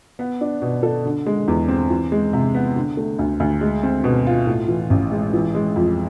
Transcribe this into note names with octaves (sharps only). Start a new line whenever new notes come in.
B3
D4
B2
A4
D3
G#3
E2
C4
E3
G#3
C3
B3
D3
A3
D2
D2
G#3
C4
B2
F4
A2
E3
A1
G#3
E3
G#3
F2